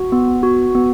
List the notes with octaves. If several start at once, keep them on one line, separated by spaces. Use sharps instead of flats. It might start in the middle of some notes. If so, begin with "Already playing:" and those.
Already playing: F#4
B3
F#4
B3